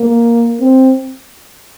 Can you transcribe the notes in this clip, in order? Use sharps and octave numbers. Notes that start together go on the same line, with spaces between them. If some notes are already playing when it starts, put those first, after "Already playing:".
Already playing: A#3
C4